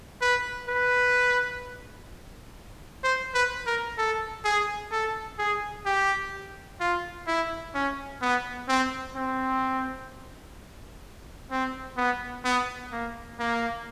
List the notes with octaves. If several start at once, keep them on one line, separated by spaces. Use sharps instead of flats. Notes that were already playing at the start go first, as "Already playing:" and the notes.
B4
B4
C5
B4
A#4
A4
G#4
A4
G#4
G4
F4
E4
C#4
B3
C4
C4
C4
B3
B3
A#3
A#3